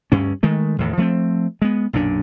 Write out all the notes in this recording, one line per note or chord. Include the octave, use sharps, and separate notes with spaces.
D2 G2 C#4
D#3 G#3 A3
E2 A2 D#3
F3 A3 B3 C4
G#3 B3
B1 F#2 A#2 D4